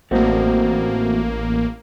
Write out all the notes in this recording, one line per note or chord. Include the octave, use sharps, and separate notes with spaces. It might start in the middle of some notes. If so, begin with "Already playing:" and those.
A1 A3 A#3 C4 F#4